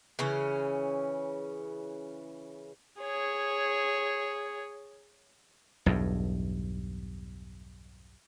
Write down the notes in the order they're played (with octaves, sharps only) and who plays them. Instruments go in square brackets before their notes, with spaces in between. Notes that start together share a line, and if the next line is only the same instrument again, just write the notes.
[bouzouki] C#3 E3 C#4
[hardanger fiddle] G#4 C#5
[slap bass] B1 E2 G2